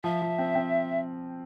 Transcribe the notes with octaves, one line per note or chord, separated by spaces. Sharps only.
F3 E5
F3
C4
C4